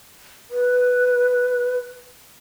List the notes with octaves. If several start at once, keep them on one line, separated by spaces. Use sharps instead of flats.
B4